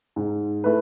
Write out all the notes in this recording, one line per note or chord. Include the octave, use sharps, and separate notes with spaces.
G#2
A3 E4 B4